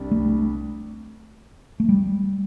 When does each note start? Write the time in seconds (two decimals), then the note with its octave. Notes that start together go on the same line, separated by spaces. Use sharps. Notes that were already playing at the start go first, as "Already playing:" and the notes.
Already playing: C2 C3 G3 D4
0.11 A3
1.80 A3
1.89 G3